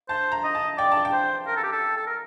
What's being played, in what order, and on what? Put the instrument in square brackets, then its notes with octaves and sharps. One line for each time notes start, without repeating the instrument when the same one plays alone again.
[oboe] C5 [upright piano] A5
[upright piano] A#5
[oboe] D#5
[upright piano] A5
[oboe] D5 [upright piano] G5
[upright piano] A5
G5
[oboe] C5
A#4
A4
G4
A4
A4
A#4